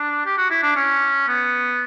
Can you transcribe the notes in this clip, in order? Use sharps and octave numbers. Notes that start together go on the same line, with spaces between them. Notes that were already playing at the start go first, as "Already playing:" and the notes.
Already playing: D4
G4
F#4
E4
D4
C#4
B3